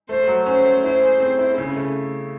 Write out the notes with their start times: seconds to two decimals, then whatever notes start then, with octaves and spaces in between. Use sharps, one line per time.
0.09 A3 C5
0.28 F#3
0.46 C#4 C5
0.65 A3
0.84 E4 C5
1.02 G#4
1.20 C4
1.39 E4
1.58 C#3 C#4
1.76 A3